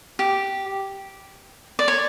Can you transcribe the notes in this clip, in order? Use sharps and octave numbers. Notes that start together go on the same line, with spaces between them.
G4
D5
C#5